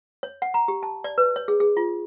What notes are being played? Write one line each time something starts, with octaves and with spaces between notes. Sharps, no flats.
C#5
F#5
A#5
G4
A5
D5
B4
C#5
G#4
G#4
F4